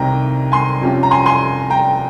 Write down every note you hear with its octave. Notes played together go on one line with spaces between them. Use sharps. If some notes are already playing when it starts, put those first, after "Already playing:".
Already playing: C2 C3 D#3 G3 C4 G5 A#5
G#5 C6
F2 C3 G3 C#4 F4
A#5
G#5 C6
G#5 C6
G5 A#5